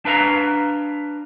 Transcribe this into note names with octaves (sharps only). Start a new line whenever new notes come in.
D4 B4 F5 A#5